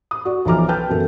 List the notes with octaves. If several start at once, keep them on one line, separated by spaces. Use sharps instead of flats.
D#6
F#4 D5
B1 E3 F3 A#5 D6 F6
B4 G5 A5 F6 G6
F#2 B2 E3 A4 A#4